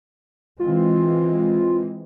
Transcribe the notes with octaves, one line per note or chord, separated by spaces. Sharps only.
E3 G#3 C4 F4